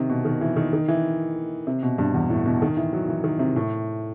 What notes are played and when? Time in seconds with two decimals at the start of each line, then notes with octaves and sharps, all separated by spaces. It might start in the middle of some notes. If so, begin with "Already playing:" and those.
Already playing: C3 D#3
0.10 B2
0.25 D#3
0.41 E3
0.56 D#3
0.73 D#3
0.88 E3
1.67 C3
1.83 B2
1.98 G2
2.14 E2
2.30 A2
2.46 B2
2.62 D#3
2.77 E3
2.93 F#3
3.09 E3
3.24 D#3
3.39 C3
3.56 A2